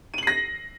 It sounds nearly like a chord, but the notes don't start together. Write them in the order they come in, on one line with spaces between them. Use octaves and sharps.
D#7 F#7 C7 A#6